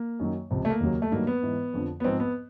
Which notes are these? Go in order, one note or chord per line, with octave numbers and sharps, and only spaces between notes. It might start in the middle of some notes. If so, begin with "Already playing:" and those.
Already playing: A#3
F#2 D#3 F#3
C#2 C3 F3
A3
A#3
D#2 C#3 F#3
A3
G2 D#3 F#3 A#3
B3
G#2 E3
F2 D3 F3
B3
G#2 F3 C4
B3